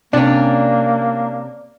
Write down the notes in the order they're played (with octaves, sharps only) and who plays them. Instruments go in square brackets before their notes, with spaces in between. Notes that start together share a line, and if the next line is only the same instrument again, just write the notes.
[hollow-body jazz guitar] C3 C#4 [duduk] A#3 [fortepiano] D4 [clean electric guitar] D5